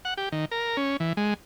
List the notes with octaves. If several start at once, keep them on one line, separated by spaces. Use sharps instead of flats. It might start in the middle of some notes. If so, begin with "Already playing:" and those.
F#5
G4
D#3
A#4
C#4
E3
G#3